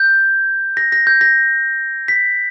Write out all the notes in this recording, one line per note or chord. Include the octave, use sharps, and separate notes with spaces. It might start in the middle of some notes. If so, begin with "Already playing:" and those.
Already playing: G6
A#6
A#6
G6
A#6
B6